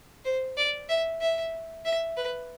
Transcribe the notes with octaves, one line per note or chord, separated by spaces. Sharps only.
C5
D5
E5
E5
E5
B4